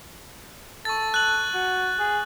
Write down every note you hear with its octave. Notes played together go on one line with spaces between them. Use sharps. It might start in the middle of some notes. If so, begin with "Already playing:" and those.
A4 C#6 A6
F#6 F#7
F#4
G#4